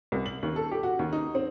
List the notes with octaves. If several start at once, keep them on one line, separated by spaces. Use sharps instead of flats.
C2
F#7
D#2
A4
G4
F#4
D#2
D#4
C4